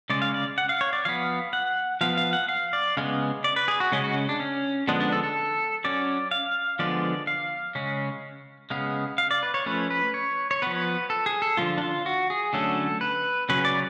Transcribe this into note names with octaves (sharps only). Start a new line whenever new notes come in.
C#3 G#3 C#4 D5
F5
D5
F#5
F5
C#5
D5
F3 B3 F5
F#5
F3 B3 F5
F5
F#5
F5
D5
C#3 G#3 B3 F5
D5
B4
G#4
F#4
C#3 G#3 C#4
F#4
D4
C#4
D3 F3 G#3 B3 D4
D4
A4
A4
F#3 C#4 D5
F5
D3 F3 G#3 B3 D5
F5
C#3 G#3 C#4
C#3 G#3 B3 F5
F5
D5
B4
C#5
F3 A3 C#4 B4
B4
C#5
C#5
F3 B3 B4
A4
G#4
A4
D3 F3 A3 F4
D4
F4
F#4
G#4
D3 F#3 A3 C#4 A4
B4
C#3 F#3 C#4 B4
D5